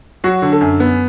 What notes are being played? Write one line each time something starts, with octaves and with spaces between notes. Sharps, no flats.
F#3 F#4
D3
A4
F#2
B3